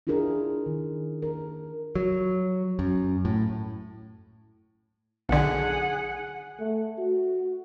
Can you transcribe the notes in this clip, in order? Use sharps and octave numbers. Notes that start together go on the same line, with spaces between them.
D4 E4 F4 G#4 A#4
D#3
A#4
F#3
F#2
A2
B1 D3 G#4 F#5
A3
F#4